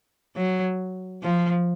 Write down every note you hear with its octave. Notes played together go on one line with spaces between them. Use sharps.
F#3
F3